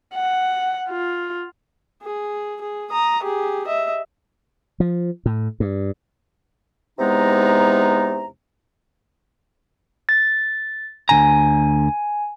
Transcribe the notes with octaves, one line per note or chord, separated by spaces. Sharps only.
F#5
F4
G#4
G#4
A#5 D#6
G4 G#4
D#5 E5
F3
A2
G2
E2 C3 G#3 B3 D#4 A#5
A6
D2 D3 G#5 A#5